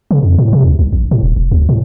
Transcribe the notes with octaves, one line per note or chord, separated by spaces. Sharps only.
C#3
F2
A2
C3
D2
C2
A#1
A2
D1
E1
D2
A2